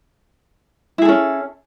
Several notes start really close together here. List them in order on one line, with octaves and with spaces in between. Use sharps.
E4 G#4 A4 C#4